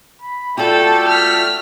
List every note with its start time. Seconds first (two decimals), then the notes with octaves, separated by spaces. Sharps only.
0.22 B5
0.57 A3 F4 F#4 A4 D5 G5
1.07 F6 B6